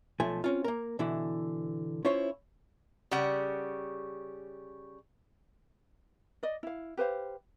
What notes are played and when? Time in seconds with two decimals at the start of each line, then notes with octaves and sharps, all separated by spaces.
0.20 B1 F3 A3 G#5
0.44 C4 C#4 F4
0.64 A#3 A#4
0.99 B2 D3 E3 E4
2.05 C#4 E4 F4 C5 C#5
3.11 C#3 G3 F#5
6.43 D5 D#5
6.63 E4 F5
6.97 G4 B4 C5 F5